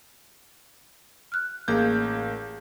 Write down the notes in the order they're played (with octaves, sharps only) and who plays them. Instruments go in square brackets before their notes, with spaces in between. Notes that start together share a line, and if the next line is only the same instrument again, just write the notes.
[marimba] F6 F#6
[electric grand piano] A1 A#3 G6 [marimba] G#4 F5